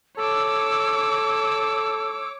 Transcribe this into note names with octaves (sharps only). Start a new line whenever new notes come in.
A4 C#5 D6 E6